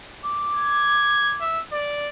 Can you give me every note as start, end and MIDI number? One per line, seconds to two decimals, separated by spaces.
0.23 1.44 86
0.56 1.35 92
1.41 1.61 76
1.72 2.08 74